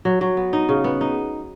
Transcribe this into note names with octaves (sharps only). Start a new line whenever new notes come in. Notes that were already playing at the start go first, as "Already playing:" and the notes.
F#3
F#3
B3
D#4
C#3
B3
D#4